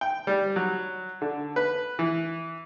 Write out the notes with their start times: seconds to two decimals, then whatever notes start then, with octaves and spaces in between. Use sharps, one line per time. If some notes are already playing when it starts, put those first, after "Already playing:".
0.01 G5
0.27 G3
0.56 F#3
1.22 D3
1.56 B4
1.99 E3